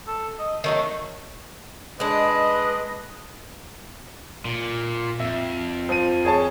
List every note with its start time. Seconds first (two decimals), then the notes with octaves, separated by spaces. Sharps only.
0.07 A4
0.39 D#5
0.64 D#3 F#3 A3 D#4
2.00 G#3 D4 B4 D#5
4.45 A#2
5.20 F2 E5
5.89 F3 D#7
6.25 G#4 C#5 A5